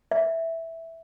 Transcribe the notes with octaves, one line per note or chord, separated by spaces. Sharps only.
E5